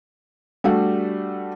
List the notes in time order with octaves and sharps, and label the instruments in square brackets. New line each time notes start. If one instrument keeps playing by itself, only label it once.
[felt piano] G3 A3 D4 F#4 G4